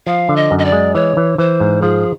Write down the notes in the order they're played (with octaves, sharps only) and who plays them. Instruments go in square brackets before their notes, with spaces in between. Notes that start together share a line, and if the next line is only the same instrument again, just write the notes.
[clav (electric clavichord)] F3 [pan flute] F5
[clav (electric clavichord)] D3
[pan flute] D#5
[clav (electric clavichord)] F#2
[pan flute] D#5
D5
[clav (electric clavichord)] G#3
[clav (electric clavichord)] E3 [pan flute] C#5
[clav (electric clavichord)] E3
[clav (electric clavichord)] E3 [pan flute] C5
[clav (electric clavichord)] G#2
[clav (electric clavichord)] F3 [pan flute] G#4